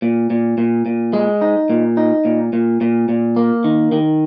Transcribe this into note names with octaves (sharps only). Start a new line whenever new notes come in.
A#2
A#2
A#2
A#2
G#3
D#4
A#2
D#4
A#2
A#2
A#2
A#2
A#3
D#3
D#3